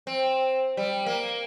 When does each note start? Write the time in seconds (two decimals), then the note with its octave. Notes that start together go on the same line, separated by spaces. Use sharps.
0.07 C4
0.77 G3
1.06 A#3